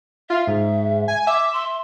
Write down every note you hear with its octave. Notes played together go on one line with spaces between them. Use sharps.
F4 E5
G#2
G#5
E5 D6
C6